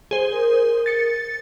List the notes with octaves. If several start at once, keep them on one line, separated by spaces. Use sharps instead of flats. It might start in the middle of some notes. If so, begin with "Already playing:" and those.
G#4 C5
A#4
A6 C#7